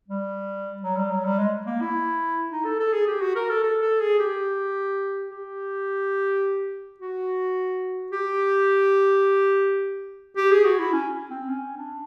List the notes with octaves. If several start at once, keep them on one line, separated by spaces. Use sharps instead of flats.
G3
F#3
G3
F#3
G3
G#3
A#3
E4
D#4
A4
A4
G#4
G4
F#4
A#4
A4
A4
A4
G#4
G4
G4
F#4
G4
G4
G#4
F#4
E4
C#4
C4
C#4
D4